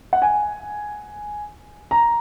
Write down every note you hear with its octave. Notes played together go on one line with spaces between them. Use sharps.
F#5
G#5
A#5